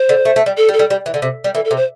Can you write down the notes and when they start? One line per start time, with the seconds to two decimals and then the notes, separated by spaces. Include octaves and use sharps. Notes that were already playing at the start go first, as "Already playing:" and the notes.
Already playing: C5
0.09 D3
0.25 A3
0.36 A3
0.46 G3
0.57 A4
0.69 G3
0.73 A4
0.79 G3
0.90 G3
1.06 E3
1.14 D3
1.22 C3
1.44 G3
1.55 E3 A4
1.65 A4
1.71 C3
1.77 C5